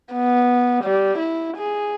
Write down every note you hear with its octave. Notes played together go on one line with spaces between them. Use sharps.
B3
G3
E4
G#4